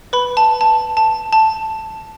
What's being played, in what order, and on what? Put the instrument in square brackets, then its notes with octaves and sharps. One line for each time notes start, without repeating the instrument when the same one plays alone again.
[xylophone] B4 B5
A5
A5
A5
A5